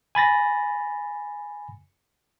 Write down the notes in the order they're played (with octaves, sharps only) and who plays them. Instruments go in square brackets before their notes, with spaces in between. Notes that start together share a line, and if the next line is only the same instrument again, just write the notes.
[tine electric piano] G#5 B5 A6 A#6